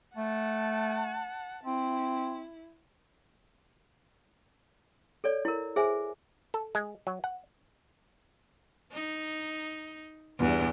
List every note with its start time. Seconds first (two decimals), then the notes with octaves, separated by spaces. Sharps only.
0.17 A3 F#5 A5
1.64 C4 E4
5.24 A4 C#5 D5
5.45 E4 A#4
5.76 G#4 C5 E5 G#5
6.54 A4
6.75 G#3
7.07 F#3
7.24 F#5
8.93 D#4
10.39 E2 G2